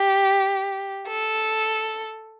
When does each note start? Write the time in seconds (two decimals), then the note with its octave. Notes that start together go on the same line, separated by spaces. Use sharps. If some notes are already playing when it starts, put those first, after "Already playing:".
Already playing: G4
1.08 A4